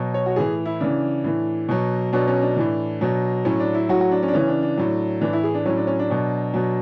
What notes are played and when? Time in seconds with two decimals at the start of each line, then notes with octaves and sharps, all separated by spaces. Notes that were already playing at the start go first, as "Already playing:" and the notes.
Already playing: B2 F#3
0.14 C#5
0.26 F#4
0.36 A2 E3 G#4
0.66 E4
0.80 C#3 E3 D4
1.24 A2 E3
1.69 B2 F#3
2.13 B2 F#3 D4
2.28 C#4
2.42 D4
2.57 A2 E3
3.01 B2 F#3
3.45 A2 F#3 C#4
3.60 D4
3.74 E4
3.89 A2 F#3 F#4
4.01 F#4
4.11 D4
4.23 C#4
4.28 D4
4.33 C#3 E3 C#4
4.48 D4
4.62 D4
4.77 A2 F#3
5.21 A2 E3 D4
5.33 E4
5.44 G#4
5.54 D4
5.66 A2 F#3 C#4
5.77 D4
5.87 C#4
5.99 D4
6.10 B2 F#3
6.54 B2 F#3